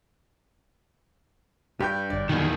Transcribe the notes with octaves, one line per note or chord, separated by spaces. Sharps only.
G2 D4 G4 B4 G5 G6
G1 F#2 D5
E2 A#2 D3 D#3 F#3